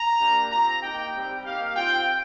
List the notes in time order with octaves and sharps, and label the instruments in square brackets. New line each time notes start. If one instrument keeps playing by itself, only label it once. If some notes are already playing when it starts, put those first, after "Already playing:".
Already playing: [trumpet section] A#5
A#3 D4 G4
C4 F4 A#5
A#3 D#4 G4 G5
G3 C4 G4
A#3 D#4 G4 F5
C4 F4 G5